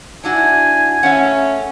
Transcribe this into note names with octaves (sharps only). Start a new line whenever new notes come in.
D4 E4 F#4 G#5
C#3 A3 C#4 E5 F#5